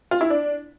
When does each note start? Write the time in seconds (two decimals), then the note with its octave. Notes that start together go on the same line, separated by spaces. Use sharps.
0.11 F4
0.21 E4
0.30 D4